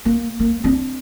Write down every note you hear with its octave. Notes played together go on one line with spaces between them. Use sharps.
A#3
A#3
C4 D4